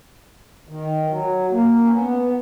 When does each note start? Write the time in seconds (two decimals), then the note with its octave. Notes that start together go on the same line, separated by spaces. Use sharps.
0.69 D#3
1.09 F#3
1.51 A#3
1.84 C#4
1.92 B3